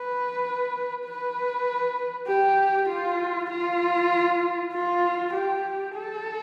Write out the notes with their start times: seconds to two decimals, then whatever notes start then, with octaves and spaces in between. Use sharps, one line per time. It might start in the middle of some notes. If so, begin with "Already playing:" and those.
Already playing: B4
1.05 B4
2.28 G4
2.89 F4
3.50 F4
4.73 F4
5.34 G4
5.95 A4